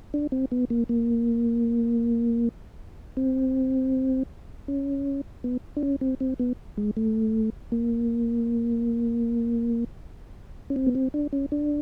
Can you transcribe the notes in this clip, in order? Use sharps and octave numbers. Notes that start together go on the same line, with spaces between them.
D4
C4
B3
A#3
A#3
C4
C#4
B3
D4
C#4
C4
C4
B3
G#3
A3
A#3
C#4
C4
B3
C4
D4
C#4
D4